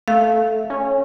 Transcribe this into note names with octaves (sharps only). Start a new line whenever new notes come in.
A3 F5
C#4